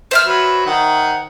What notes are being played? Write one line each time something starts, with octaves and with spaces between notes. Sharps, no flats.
C5 E5 F6
F#3 B4
D#3 F#5